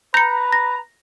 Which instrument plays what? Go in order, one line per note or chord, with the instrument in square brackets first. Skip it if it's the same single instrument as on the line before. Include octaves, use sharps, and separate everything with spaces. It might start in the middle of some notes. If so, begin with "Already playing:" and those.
[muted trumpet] B4 [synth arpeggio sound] A#5 [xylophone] G6 C#7
[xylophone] A#6